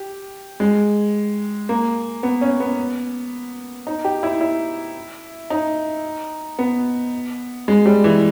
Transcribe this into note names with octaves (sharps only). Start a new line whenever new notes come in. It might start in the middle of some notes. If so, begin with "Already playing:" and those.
Already playing: G4
G#3
A#3
B3
C#4
B3
D#4
G4
E4
E4
D#4
B3
G#3
G3
E3